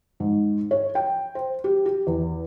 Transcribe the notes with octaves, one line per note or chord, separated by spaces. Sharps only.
G#2
C#5
G5
C5
G4
G4
E2